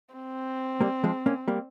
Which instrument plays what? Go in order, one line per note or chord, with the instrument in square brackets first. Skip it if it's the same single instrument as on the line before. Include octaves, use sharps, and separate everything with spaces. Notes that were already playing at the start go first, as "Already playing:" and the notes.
[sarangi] C4
[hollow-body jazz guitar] G3 A#3
F3 G#3
A#3 C#4
G3 A#3